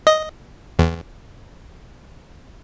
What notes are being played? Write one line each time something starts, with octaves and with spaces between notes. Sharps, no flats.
D#5
E2